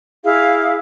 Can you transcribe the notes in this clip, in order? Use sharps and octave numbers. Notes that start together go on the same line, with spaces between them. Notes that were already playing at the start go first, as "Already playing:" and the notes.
E4 G#4 F5